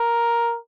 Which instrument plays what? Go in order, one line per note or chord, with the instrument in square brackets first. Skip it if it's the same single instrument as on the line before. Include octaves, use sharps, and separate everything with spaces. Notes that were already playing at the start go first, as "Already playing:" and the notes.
Already playing: [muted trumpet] A#4